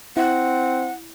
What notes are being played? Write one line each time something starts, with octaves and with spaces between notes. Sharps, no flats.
C4 E4 F#5